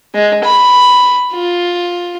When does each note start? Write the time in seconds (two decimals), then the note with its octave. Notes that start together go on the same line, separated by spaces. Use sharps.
0.15 G#3
0.44 B5
1.34 F4